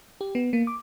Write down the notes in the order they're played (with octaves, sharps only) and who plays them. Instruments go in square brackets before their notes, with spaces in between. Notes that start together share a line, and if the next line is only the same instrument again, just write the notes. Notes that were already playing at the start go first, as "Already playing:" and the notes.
[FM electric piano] G4
B3
A#3
D6